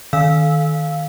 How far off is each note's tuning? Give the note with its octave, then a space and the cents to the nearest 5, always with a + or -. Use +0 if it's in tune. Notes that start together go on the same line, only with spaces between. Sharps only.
D#3 +0 F5 +0 E6 -15